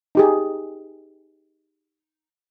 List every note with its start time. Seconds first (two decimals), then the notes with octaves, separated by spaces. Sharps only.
0.15 D#4 G4 G#4